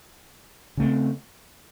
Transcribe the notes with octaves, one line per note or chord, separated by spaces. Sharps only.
C#3 A3 C4